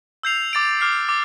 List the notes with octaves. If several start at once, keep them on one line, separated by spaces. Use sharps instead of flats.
E6 G6 C7 F7
D6 A6 D7 F7
D6 F6 C7
D6 A6